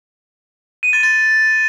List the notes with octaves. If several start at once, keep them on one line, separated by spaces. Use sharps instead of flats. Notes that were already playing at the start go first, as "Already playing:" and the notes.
D#7
A6
A6